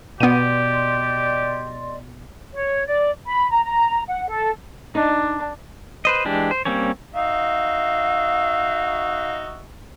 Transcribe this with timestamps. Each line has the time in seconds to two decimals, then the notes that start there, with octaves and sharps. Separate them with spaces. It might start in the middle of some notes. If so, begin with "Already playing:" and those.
0.20 B2 B3 G4 D5 D#5 C6 D#7
2.54 C#5
2.86 D5
3.26 B5
3.51 A#5
3.64 A#5
4.08 F#5
4.28 A4
4.95 D4 D#4
6.05 B4 C5 D#5
6.25 E3 G#3 D4 G4
6.51 C5
6.65 G3 A#3 C4 C#4 C#5
7.14 D#4 F#4 E5 F5